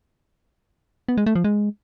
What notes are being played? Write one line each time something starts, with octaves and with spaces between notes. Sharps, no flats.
B3
G#3
A3
F3
G#3